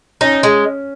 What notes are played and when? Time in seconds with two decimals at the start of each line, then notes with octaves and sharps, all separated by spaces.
0.21 C#4 D#4
0.43 G#3